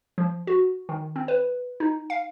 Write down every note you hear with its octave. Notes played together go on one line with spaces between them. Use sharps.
F3
F#4
D#3
C4
B4
D#4
F5